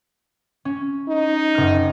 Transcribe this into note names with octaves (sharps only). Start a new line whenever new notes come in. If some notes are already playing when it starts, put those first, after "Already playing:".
C#4
D#4
F#1 F6